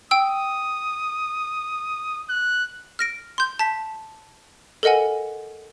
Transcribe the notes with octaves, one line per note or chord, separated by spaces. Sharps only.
G5 D#6 E6
F#6
F6 A#6 D7
C6 G6
A5 B6
A4 A#4 D#5 F#5 G#5